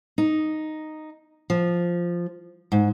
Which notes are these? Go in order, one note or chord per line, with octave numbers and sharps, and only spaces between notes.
D#4
F3
G#2